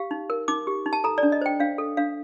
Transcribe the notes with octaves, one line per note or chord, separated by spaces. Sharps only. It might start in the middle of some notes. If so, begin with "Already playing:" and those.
Already playing: G4 F5
D#4
A#4
D#4 D6
G4
D#4
A5
A4 A#5
D5
D4
D#5
C5 G5
D4 F5
A4
D4 F5